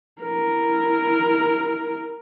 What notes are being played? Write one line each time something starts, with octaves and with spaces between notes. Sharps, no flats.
E4 A#4